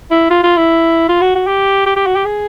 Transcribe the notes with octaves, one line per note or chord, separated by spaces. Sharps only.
E4
F4
F4
E4
F4
F#4
F#4
G4
G4
G4
F#4
G4
G#4